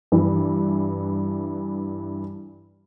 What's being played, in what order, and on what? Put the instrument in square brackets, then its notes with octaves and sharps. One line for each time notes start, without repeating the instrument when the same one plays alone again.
[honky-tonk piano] G2 E3